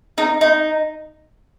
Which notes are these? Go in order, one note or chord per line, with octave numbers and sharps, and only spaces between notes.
D#4
D#4